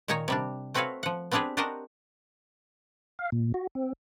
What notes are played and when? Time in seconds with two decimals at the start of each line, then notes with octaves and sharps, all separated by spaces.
0.08 A#2 D#3 D#4 C#5 G#5 A#5
0.28 C3 G3 D4
0.74 A3 C4 F#4 B4 C#5 F5
1.03 F3 F#5
1.31 B3 C4 D4 G4 G#4 B4
1.57 D4 F#4 G4 A#4 C5 D#5
3.19 F5
3.32 A#2
3.54 F#4
3.75 C4